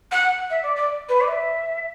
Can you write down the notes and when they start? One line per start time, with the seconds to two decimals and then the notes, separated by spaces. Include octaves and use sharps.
0.12 F#5
0.50 E5
0.63 D5
0.76 D5
1.09 B4
1.21 D5
1.28 E5